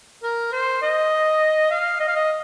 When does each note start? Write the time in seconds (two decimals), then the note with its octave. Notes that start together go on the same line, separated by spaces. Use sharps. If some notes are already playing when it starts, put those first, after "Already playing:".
0.23 A#4
0.52 C5
0.82 D#5
1.71 F5
2.00 D#5
2.08 F5
2.15 D#5